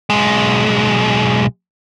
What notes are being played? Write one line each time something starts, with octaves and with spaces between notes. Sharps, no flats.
B1 G#3